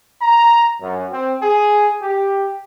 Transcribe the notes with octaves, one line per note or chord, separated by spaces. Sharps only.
A#5
F#2
C4
G#4
G4